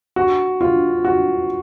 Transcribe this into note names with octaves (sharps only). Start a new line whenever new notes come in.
F#4
F4
F#4